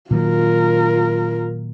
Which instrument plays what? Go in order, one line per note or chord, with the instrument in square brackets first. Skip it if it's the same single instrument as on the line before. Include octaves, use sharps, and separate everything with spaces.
[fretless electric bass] A#2 D#3 F#3 [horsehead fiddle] F4 A#4